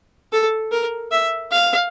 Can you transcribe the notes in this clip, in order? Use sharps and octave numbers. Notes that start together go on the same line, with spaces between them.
A4
A#4
E5
F5